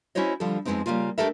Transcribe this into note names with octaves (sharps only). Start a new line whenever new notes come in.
C#4 E4 F#4 C5 C#5 D#5
D3 F3 G3 A4
F2 C3 G#3 B3 C4 D#4
C#3 G3 A3 A#3 F4
A3 D4 G4 A4 A#4 E5